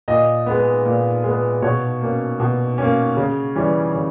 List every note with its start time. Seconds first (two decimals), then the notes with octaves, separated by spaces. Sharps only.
0.08 A#2 D#5
0.46 G#3 B3
0.85 A#2
1.24 G#3 B3
1.62 B2 C#5
2.01 A#3 C#4
2.40 B2
2.78 A#3 C#4
3.17 C#3
3.56 E3 G3 C#4
3.94 C#3